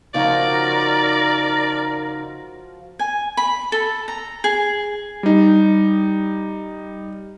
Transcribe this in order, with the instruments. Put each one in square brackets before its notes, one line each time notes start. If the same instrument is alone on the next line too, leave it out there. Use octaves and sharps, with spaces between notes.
[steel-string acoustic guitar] C#3 D#4 [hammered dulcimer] F3 F4 F#4 [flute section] A#4 [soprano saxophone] D5
[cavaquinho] G#5
B5
A4
A#5
G#4
[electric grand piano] G3 D#4